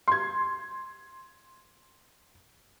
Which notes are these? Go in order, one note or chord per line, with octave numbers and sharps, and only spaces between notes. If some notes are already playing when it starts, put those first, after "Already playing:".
C6 G#6